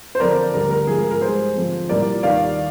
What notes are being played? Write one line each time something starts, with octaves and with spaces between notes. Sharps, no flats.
C5
F2 D3 F3 A#4 D5
D2 D3 G3 A#4
A#4
G#2 F3 G#4
A#4
A#4
G#2 G3 G#4 C5
F2 D3 F3
C2 A#2 G3 A#4 D5
D#2 D#3 G3 D5 F5